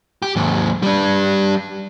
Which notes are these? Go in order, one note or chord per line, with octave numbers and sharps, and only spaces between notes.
G4
D#2 G#2
G3 D4